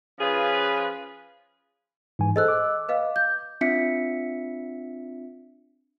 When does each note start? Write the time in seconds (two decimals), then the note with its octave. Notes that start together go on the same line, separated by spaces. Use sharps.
0.18 F3 C#4 F4 G#4 B4
2.19 G#2 E3 G#5
2.36 G#4 A4 C5 D#5 E6 F#6
2.48 D6
2.89 B4 D#5 F5
3.16 G6
3.61 C4 D4 F4 E5 B6 C#7